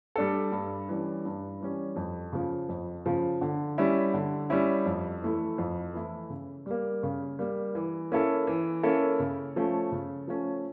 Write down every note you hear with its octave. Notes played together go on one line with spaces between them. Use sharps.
G3 D4 A4
G2
E3 G3 C#4
G2
E3 G3 C#4
F2
C#3 F3
F2
C#3 F3
D3
G3 C#4 E4
D3
G3 C#4 E4
F2
E3 A3 E4
F2
E3 A3 E4
C#3
G3 A#3
C#3
G3 A#3
E3
A#3 C#4 E4 A4
E3
A#3 C#4 E4 A4
C#3
F3 A3 C#4
C#3
F3 A3 C#4